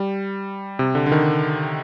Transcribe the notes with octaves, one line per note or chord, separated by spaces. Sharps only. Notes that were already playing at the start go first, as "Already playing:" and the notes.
Already playing: G3
C3
D3
D3
D#3